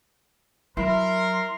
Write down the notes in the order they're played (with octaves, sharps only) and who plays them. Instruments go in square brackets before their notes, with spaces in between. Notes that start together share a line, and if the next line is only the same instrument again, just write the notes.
[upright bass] F#3 [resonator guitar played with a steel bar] E4 [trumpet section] A#4 [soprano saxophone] C6